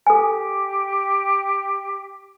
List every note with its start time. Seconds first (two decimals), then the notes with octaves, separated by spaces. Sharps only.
0.07 G4 A4 G#5